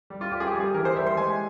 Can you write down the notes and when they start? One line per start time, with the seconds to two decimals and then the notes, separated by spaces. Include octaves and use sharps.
0.10 G3
0.21 F4
0.32 G3 G4
0.40 G#4
0.46 G4
0.54 G3
0.60 G#4
0.74 E3 A#4
0.85 C5
0.96 G3 E5
1.07 C6
1.17 G#3 G#5